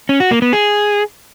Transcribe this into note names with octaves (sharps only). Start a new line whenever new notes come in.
C#4
F#4
A#3
B3
G#4